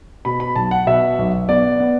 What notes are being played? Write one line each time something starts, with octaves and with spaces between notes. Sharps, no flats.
B2 B5
B5
B1 A5
F#5
B2 E5
B1
B3 D5
B3